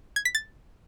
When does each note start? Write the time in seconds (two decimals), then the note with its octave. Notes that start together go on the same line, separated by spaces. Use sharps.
0.16 G#6
0.25 B6
0.35 A6